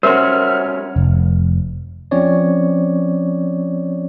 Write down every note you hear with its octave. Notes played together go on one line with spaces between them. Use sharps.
G3 C#4 F#4 A#4 C5 E5 C6 F6
F1
F3 C4 C#4 C#5 D5